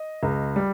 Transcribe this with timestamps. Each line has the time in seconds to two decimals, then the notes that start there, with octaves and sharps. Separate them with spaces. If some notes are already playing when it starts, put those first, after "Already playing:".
Already playing: D#5
0.23 C#2
0.56 G3